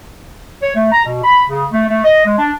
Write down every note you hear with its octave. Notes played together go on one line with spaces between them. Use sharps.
C#5
A3
A#5
B2
B5
C#3
A3
A3
D#5
G#3
D4